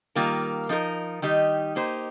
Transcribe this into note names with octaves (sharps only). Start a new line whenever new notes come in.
D#3 G3 A#3 F4 A#4
F3 D#4 A#4
D#3 G3 D#4 G4
A#3 D#4 G4 C5